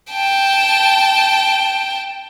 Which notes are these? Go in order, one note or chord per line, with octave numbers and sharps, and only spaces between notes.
G5 A5